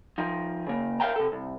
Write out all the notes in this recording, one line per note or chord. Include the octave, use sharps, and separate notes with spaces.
F3 D#4
C#3 A#3
A#4 E5 F5 G5 A#5
C3 A4
C2